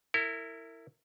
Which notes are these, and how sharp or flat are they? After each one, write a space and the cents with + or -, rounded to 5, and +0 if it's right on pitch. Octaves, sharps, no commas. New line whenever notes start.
E4 +0 A#4 -35